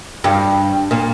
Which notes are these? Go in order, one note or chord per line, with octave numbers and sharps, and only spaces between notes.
G2
A#2